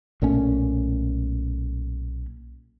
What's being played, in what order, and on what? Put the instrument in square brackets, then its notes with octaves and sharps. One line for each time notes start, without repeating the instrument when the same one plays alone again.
[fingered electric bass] B1 A#2 A3 C#4